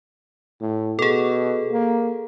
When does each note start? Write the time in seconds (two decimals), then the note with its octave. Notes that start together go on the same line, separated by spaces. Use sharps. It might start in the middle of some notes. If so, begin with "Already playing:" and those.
0.61 A2
0.99 B2 G#4 A4
1.72 A#3